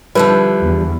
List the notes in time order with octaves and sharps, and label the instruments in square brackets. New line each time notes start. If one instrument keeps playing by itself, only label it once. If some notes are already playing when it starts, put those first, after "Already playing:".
[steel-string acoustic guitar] D3 F3 G3 [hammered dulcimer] E4 [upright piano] B4
[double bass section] E2